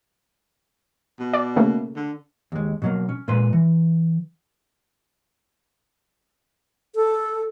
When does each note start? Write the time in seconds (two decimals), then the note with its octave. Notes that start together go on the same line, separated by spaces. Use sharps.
1.20 B2
1.33 D5
1.56 C#3 A3 A#3
1.96 D3
2.52 D#2 G#3
2.82 B2 F#3 A#3
3.09 C#4
3.28 A#2 G#3 B4 C6
3.53 E3
6.95 A4